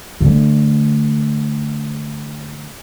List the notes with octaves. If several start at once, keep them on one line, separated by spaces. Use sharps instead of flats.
D3 A3